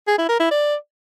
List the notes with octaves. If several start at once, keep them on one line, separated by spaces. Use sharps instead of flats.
G#4
E4
A#4
E4
D5